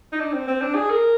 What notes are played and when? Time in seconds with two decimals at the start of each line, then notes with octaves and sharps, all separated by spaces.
0.13 D#4
0.20 D4
0.34 C4
0.48 C4
0.62 D4
0.75 G#4
0.90 A#4